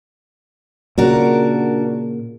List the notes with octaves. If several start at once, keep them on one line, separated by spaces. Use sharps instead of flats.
A#2 C#3 D4 F#4 A#4